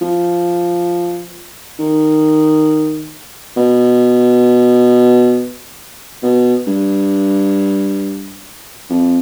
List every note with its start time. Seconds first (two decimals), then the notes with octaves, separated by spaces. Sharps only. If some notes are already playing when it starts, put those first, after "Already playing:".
0.01 F3
1.79 D#3
3.57 B2
6.23 B2
6.67 G2
8.90 F2